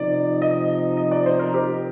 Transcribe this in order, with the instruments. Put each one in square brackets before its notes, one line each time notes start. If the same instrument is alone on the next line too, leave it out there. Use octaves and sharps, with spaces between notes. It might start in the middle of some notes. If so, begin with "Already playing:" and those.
Already playing: [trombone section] C3 F3 C4 D#4 [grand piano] D5
[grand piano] D#5
D#5
D5
C5
A#4
G4